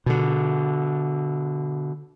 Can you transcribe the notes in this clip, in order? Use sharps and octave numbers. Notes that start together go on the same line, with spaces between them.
B2 D3